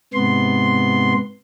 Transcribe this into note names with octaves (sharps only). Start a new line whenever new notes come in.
G#2 C3 B3 C6